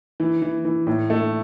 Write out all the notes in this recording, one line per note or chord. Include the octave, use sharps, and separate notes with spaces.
E3
E3
E3
A2
A3